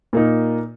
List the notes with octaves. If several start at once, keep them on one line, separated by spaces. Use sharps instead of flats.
A#2 A#3 D#4